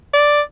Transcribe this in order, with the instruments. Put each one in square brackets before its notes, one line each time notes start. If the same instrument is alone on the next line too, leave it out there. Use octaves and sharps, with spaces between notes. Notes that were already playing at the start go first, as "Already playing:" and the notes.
[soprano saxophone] D5